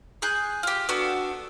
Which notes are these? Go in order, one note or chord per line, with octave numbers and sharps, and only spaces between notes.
G#4 G#5 F#6 G6
F4 G4
B3 D4 F#4 A4